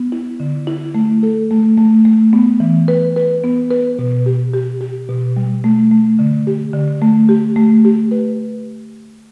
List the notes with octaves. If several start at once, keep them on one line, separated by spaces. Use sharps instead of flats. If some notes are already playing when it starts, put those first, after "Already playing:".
Already playing: B3
E4
D3
E4
A3
A4
A3
A3
A3
B3
E3
B4
B4
B3
B4
B2
G4
G4
G4
B2
G3
A3
A3
D3
G4
D3
A3
G4
A3
G4
B4